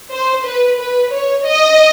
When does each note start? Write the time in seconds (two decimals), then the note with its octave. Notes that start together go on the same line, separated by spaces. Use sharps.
0.12 C5
0.46 B4
0.79 B4
1.13 C#5
1.47 D#5